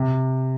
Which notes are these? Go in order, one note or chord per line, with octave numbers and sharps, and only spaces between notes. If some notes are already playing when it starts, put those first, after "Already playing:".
Already playing: C3